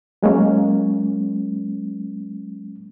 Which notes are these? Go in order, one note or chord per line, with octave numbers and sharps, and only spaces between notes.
F#3 G#3 A#3 C#4